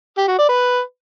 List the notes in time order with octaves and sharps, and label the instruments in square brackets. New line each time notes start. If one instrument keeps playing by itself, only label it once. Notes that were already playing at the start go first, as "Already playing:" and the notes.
[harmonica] G4
F#4
D5
B4